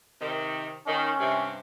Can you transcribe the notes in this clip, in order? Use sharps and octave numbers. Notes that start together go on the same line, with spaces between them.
C3 D#3
D#3 C#4
G2 C3